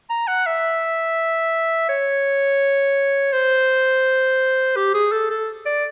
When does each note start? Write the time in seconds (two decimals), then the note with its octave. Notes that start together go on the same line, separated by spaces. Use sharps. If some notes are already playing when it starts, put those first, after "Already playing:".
0.10 A#5
0.28 F#5
0.46 E5
1.89 C#5
3.33 C5
4.76 G4
4.94 G#4
5.12 A4
5.30 A4
5.66 D5